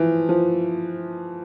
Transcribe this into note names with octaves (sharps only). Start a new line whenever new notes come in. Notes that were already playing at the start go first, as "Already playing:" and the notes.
Already playing: E3 F3
F3